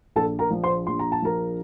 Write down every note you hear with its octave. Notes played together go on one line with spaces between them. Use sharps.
A#1 A4 A5
A#4 A#5
F3
C5 C6
A#1 C6
A#5
A5
F3 A#4 A#5